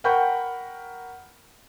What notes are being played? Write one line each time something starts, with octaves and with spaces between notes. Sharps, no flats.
A#4 F#5 G5 B5 C#6 G6